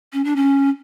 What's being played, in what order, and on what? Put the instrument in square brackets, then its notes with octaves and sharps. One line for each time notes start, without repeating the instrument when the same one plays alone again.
[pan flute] C#4
D4
C#4